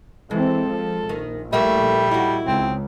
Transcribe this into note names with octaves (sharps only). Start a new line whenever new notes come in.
E3 G#3 C4 A4
F3
A#1 D#3
G3 A3 A#3 E4 E5
D#4 E4 F#4
C#2 C4